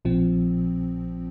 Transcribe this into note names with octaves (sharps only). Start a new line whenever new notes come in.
A#1 A#2 F3 C4